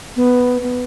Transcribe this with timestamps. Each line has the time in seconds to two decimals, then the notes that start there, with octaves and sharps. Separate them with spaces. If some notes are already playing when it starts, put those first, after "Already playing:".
0.16 B3
0.62 B3